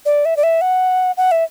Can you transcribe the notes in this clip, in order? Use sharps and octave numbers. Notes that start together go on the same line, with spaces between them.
D5
E5
D5
E5
F#5
F#5
E5